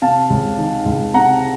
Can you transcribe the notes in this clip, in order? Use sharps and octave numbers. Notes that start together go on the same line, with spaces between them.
C3 F5 A5
C#2
D#3
C#2
C3 F#5 A#5